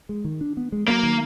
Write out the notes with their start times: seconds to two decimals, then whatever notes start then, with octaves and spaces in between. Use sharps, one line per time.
0.09 G#3
0.24 D#3
0.41 D4
0.57 B3
0.72 G#3
0.88 F#3 A#3
1.03 D#3